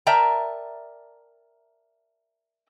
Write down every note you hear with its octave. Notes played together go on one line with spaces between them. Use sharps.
A#4 D5 E5 G5 A5 A#5